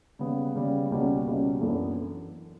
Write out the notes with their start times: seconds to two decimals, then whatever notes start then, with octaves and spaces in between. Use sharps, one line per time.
0.19 C#3 G3 B3
0.55 C#3 G3 B3
0.90 C#2 B2 G3 C#4 F#4
1.26 C#2 B2 G3 C#4 F#4
1.61 F#2 E3 B3 D4 A4